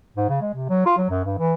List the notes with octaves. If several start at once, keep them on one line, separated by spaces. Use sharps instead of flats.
G#2
C#3
G#3
C3
F#3
F4
F#3
F#2
G2
E3